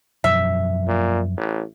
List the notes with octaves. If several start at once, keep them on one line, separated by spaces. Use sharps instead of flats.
F#2 B2 F3 E5
A#2
A1